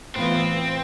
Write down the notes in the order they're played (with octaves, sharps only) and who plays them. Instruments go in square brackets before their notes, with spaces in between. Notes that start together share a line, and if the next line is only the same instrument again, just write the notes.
[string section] A2 E3 B3 F4 B4 [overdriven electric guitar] C4